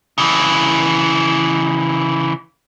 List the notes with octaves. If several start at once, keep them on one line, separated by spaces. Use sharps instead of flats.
C#3 E3